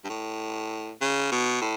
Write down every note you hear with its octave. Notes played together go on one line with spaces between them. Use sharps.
G2
A2
C#3
B2
A2